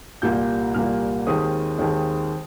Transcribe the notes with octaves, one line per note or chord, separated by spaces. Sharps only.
C2 A#2 G3 A#3 G6
C2 A#2 G3 A#3 F6
D#2 D#3 G#3 C4 D#6
D#2 D#3 G#3 C4